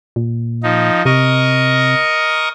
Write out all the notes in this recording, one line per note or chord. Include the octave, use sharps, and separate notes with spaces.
A#2
F3 D#4
C3 A#4 D#5 C#6